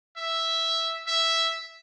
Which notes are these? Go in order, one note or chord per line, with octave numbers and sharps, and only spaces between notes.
E5
E5